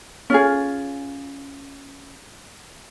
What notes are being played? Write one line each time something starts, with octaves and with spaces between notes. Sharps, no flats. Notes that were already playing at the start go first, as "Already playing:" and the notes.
C#4 F4 G#4